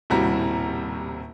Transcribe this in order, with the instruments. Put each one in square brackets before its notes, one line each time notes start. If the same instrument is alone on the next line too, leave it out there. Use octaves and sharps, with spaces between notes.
[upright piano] D#1 A2 C3 G3 F#4 A#5